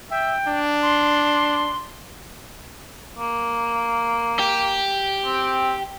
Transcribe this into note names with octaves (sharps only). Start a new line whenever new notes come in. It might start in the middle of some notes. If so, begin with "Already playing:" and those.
E5 G5
D4
C6
A#3
G4
C4